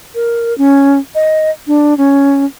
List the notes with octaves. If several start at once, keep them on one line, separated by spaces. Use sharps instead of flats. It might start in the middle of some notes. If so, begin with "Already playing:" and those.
A#4
C#4
D#5
D4
C#4